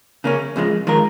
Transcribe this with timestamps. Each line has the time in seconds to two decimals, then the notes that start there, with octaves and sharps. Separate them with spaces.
0.24 C#3 A#3 C#4
0.56 C#2 C#3 F3 G#3
0.87 D#3 G#3 F4 A#4